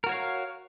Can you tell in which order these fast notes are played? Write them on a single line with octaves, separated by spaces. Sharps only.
A#4 F#4 C#5 F5